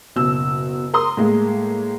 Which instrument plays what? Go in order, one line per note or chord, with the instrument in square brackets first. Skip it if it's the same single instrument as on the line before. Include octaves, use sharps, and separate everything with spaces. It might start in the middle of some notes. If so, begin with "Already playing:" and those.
[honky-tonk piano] F#1 B2 E6
A#4 C6 D#6
A2 G#3 A#3